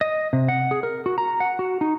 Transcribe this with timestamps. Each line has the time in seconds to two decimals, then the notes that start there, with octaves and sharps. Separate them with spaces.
0.01 D#5
0.33 C3
0.48 F#5
0.71 G#4
0.83 A#4
1.06 F#4
1.18 A#5
1.40 F#5
1.59 F#4
1.81 D#4